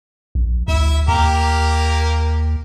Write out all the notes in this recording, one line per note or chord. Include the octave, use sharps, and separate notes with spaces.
A#1
D2 E4 E5
D#2 A#3 G4 A#4